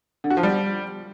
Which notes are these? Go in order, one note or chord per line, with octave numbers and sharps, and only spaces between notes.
D3
F#4
F3
G3